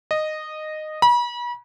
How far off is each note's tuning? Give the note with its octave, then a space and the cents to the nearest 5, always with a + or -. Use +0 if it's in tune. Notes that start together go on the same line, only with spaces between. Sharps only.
D#5 -10
B5 -40